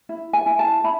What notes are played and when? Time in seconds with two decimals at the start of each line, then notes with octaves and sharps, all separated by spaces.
0.09 E4
0.33 G#5
0.46 E4
0.59 A5
0.84 E4 B5